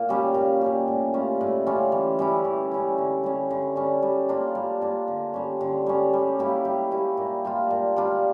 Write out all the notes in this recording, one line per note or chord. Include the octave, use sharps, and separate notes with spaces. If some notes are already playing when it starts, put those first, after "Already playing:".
Already playing: A#2
G3 C#4 G4
A#2
G3 C#4 G4
A2
G3 C#4 F4
A2
G3 C#4 F4
E3
G3 C#4 E4
E3
G3 C#4 E4
D3
G3 C#4
D3
G3 C#4
G3
A#3 D4 F4
G3
A#3 D4 F4
D3
G3 C#4
D3
G3 C#4
G3
A#3 E4 G4
G3
A#3 E4 G4
A#2
G3 D4 F4
A#2
G3 D4 F4